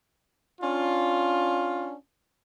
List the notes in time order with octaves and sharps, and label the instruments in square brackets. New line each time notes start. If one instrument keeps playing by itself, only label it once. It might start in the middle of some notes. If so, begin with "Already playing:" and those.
[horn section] C#4 D4 F4